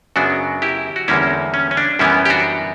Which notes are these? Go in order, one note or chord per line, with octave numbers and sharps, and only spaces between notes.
F#2 C#3 F#3 B3 D4 F#4
E4 G4
F#4
E2 D3 G3 A#3 C#4 E4
C#4
C#4
D4
F#2 E3 G3 B3 C#4 E4
G4
D4 F#4